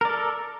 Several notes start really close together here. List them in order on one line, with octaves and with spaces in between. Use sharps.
A#4 D5 A4